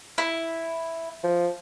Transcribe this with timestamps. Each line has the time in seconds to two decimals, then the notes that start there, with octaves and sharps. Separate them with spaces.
0.18 E4
1.23 F3